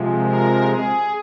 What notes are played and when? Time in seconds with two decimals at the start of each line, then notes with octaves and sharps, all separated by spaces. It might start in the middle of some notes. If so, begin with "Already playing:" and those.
Already playing: C3 F3 G#3
0.21 A#4
0.65 G#4